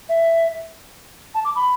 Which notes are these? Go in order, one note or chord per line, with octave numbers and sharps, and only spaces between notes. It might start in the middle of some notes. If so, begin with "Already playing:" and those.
E5
A5
D6
B5